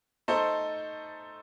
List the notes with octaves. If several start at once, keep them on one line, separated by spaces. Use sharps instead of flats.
A3 D#4 A4 C5